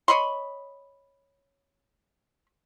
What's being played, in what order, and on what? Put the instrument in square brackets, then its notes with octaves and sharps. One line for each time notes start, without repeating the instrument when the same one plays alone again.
[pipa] C#5 D#5 B5 C6